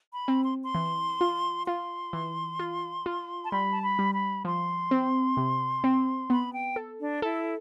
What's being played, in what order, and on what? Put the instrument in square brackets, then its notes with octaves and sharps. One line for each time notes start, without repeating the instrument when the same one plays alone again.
[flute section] B5
[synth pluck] C4
[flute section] C6
C6
[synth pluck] E3
F4
[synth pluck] F4 [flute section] C6
[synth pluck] E3
F4
F4
[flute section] A5
[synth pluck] G3 [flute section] B5
[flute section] A5
B5
[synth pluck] G3
[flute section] B5
[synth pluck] F3 [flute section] C6
[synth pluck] C4
C3
C4
[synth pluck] B3 [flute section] B5
[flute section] G5
[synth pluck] A4
[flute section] D4
[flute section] E4 [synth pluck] A4